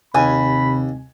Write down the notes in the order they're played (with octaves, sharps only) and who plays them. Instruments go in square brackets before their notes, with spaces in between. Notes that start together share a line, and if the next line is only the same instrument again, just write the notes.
[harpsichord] D#2 [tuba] C3 [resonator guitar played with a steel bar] G#5 [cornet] B5